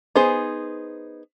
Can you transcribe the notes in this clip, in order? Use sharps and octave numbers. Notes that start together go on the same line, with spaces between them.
B3 D#4 G#4 C5